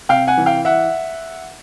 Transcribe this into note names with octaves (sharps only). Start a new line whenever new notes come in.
C3 F5 G5
F#5 G#5
E3
F5 G5
E5 F#5